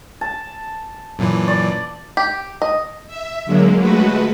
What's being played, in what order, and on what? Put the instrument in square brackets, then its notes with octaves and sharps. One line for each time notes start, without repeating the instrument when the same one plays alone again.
[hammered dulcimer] A5
[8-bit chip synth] F#2 A#2 E3
[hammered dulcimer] D5
[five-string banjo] G4
D#5
[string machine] E5
D3 F#3 G#3 A#3
G#3 A3 F#4 B4